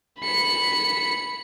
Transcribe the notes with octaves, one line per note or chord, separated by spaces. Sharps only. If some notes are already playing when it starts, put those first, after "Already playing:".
B5 C#7